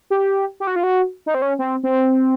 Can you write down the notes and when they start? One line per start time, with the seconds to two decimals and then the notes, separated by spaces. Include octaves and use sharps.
0.10 G4
0.60 G4
0.67 F#4
0.76 F4
0.83 F#4
1.26 D#4
1.34 C4
1.42 C#4
1.59 C4
1.83 C4